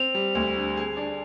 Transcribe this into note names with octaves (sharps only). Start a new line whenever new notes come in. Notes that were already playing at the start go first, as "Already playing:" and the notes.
Already playing: C4 F7
G3
D2
D3
G#4
D4